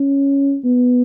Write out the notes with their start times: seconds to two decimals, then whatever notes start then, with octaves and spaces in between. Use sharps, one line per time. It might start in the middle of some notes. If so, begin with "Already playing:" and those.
Already playing: C#4
0.65 B3